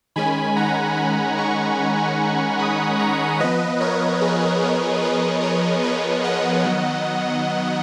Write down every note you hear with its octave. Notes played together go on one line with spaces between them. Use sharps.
D#3 G#3 C#4 G#5 B5
F#5 A#5
G#5 B5
A#5 C#6
B5 D#6
A#5 C#6
F3 B3 B4 D#5
A#4 C#5
G#4 B4
A#4 C#5
G#4 B4
A#4 C#5
B4 D#5
D#5 F#5
D#3 F#3 B3